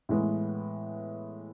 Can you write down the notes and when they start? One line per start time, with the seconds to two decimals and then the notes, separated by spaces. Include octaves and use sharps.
0.09 A2 E3 G#3 B3